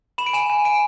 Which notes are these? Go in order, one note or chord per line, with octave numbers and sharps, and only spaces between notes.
B5 E7
D7
G#5 E7
G#5
G#5 D7